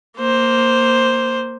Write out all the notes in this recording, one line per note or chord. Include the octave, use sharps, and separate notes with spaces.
A#3 C5